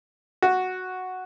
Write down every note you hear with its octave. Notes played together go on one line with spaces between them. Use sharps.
F#4